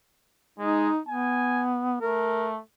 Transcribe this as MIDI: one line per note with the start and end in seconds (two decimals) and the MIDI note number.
0.59 0.89 56
0.59 0.99 63
1.07 1.96 59
1.07 1.67 80
2.01 2.60 57
2.01 2.50 70